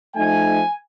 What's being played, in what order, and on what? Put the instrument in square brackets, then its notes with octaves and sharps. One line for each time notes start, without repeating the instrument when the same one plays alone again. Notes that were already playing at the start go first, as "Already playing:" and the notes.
[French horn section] F3 A3 D#4 [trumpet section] G#5